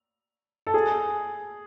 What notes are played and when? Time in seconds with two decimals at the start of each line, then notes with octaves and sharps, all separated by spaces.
0.67 A4
0.74 G#4